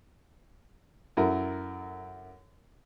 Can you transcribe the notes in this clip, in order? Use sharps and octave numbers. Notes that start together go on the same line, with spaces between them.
F#2 E4 A4 A#4 A#5